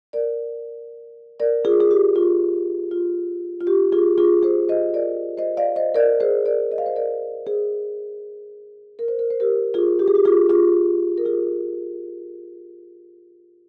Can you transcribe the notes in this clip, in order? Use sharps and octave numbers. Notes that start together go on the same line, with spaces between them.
A#4 D5
A#4 D5
F4 G#4
G#4
G4
F4
F4
F4
G4
F4 G#4
F4 G#4
G#4 C5
C5 D#5
A#4 D5
C5 D#5
D5 F5
C5 D#5
A#4 D5
G#4 C5
A#4 D5
D#5
F5
C5 D#5
A#4 D5
G#4 C5
A#4
C5
A#4
C5
G4 A#4
F4 G#4
G4
G#4
G4
F4 G#4
F4 G#4
A#4
F4 G#4